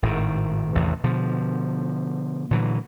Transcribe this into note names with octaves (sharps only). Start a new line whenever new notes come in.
G#1 A2 D#3
A1 E2 C3 D#3
B2 D3 F3
A#2 D3 E3 F#3